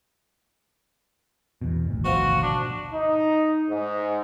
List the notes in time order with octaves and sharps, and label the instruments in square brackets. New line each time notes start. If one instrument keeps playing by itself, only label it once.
[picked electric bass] E2 B2
G#1 D2
[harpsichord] B2 F3 [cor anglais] F#4
[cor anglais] D4
[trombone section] D#4
G#2